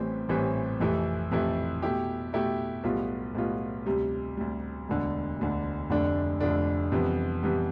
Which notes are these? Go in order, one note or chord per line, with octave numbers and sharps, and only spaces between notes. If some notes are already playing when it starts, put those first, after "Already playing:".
Already playing: A1 A2 E3 G3 C4
A1 A2 E3 G3 C4
F2 C3 E3 A3 E4
F2 C3 E3 A3 E4
B2 A3 E4 G4
B2 A3 E4 G4
B1 A2 G3 B3 F4
B1 A2 G3 B3 F4
D2 C3 G3
D2 C3 G3
E1 D2 D3
E1 D2 D3
F1 F2 D3 A3 D4
F1 F2 D3 A3 D4
F2 C3 E3 G3 B3
C3 E3 G3 B3